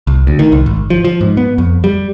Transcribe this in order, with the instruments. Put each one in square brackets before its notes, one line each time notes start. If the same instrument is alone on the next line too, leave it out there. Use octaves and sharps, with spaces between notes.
[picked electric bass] C2
D2
D#3
C2
G#1
F3
F3
G#2
B3
F2
G3